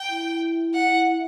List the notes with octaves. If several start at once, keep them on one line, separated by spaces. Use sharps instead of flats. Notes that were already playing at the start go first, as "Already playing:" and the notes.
Already playing: G5
E4
F#5